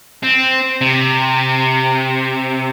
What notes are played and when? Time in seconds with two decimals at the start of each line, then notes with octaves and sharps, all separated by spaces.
0.23 C4
0.81 C3